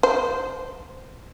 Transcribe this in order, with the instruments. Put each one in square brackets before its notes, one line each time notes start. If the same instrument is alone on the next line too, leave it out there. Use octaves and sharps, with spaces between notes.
[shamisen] C5